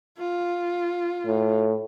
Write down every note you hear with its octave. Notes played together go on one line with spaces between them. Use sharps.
F4
A2